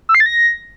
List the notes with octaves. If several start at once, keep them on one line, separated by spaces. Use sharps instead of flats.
E6
C7
A6
A#6